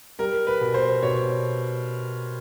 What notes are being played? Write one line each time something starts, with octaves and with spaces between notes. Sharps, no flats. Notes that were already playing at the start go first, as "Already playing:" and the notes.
G3 A#4
B4
B2
C5
B2 C#5